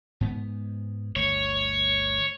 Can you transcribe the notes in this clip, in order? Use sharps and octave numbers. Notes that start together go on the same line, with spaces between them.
G#2 B3
G1 D2 C#5